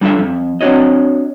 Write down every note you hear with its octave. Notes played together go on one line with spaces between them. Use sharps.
G3 D4 F4 A4 E5
F2
C4 D4 F#4 C#5 D#5